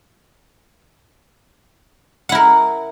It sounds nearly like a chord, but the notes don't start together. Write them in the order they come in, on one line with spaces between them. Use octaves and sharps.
F#5 E4 A#4